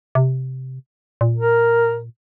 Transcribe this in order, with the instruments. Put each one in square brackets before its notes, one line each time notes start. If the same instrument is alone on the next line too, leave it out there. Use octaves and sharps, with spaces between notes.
[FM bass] C3
A#2
[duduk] A#4